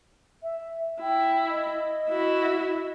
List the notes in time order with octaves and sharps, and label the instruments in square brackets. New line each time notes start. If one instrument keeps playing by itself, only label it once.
[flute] E5
[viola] E4 [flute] G5
[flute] D#5
[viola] E4 F#4